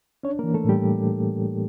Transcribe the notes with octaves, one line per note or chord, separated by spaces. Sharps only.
C#4 D4 C#5
A#3 A#4
E3
A3 A4
A2 G3 G4